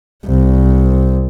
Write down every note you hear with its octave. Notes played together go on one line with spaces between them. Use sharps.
C2